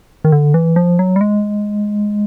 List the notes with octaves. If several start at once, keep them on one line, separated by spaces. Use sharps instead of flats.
D#3
D3
E3
F3
F#3
G3
G#3